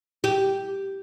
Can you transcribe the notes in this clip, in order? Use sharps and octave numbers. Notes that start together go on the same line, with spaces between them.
G4